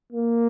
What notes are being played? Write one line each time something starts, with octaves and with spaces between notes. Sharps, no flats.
A#3